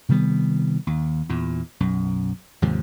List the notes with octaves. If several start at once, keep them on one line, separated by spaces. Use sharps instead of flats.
C3 D#3 G3 B3
D#2
E2 A#2
B1 F#2
D#2 G#2 C3 F3